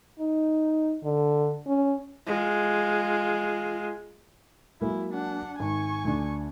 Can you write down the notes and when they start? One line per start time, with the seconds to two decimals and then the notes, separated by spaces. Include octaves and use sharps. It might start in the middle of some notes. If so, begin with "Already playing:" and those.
0.20 D#4
1.03 D3
1.67 C#4
2.27 G#3 F4
4.81 F#3 G#3 A#3 E4
5.13 D4 F#5
5.59 G#1 G#5 C#6
6.05 D2 D4